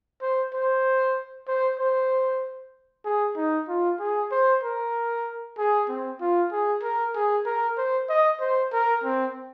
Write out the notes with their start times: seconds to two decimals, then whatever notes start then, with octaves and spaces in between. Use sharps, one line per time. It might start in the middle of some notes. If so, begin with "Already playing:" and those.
0.22 C5
0.53 C5
1.48 C5
1.79 C5
3.05 G#4
3.36 D#4
3.68 F4
3.99 G#4
4.31 C5
4.63 A#4
5.58 G#4
5.89 C4
6.21 F4
6.52 G#4
6.83 A#4
7.15 G#4
7.46 A#4
7.78 C5
8.09 D#5
8.40 C5
8.72 A#4
9.04 C4